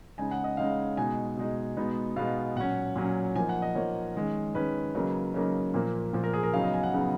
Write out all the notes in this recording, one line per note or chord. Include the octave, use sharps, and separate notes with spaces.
C#3 G#3 D#4 G#5
F#5
D#5
C#3 G#3 D#4 F5
B2 G#3 D#4 G#5
B2 G#3 D#4
B2 G#3 B3 D#4
B2 G#3 B3 D#4 F5
A#2 F#3 C#4 F#5
A#2 F#3 C#4
F3 A#3 D#4 G#5
F#5
D#5
F3 A#3 D#4 C#5
D#3 G#3 C#4
D#3 G#3 C#4 B4
C#3 F#3 A#3 D#4
C#3 F#3 A#3 D#4
A#2 F3 A#3
A#2 F3 A#3
A#4
G#4
A#4
C#3 F#3 B3 D#4 F5
D#5
G#5
F#5
C#3 F#3 B3 D#4